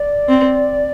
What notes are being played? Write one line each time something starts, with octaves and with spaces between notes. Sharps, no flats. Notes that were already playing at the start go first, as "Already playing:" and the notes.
Already playing: D5
C4